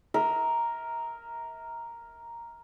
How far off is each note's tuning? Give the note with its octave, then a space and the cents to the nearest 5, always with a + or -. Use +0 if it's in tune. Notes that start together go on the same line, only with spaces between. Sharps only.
A#4 +0 E5 -40